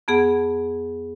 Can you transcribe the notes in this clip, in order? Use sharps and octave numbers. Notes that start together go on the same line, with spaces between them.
F2 B3 G#4 F#5